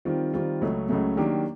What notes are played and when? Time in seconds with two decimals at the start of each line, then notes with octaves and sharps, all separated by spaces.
0.05 D#3 G3 C4 F4
0.33 D#3 G3 C4 F4
0.61 C#2 C#3 F#3 A3
0.89 C#2 C#3 F#3 A3
1.17 D#3 F#3 A#3 D4 G4